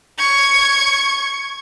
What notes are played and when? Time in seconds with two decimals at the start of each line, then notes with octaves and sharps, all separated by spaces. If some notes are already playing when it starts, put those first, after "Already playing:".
0.18 C#6 G#6